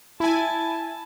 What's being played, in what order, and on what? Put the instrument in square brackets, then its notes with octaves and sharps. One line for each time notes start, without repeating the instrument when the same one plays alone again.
[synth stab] E4 G#5 [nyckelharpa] A5